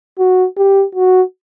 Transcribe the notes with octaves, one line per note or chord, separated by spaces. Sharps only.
F#4
G4
F#4